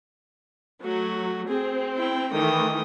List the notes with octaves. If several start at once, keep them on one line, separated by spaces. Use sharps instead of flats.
F#3 A3 F#4
C4 G#4
E4 G5
D#3 E3 A3 G5 D#6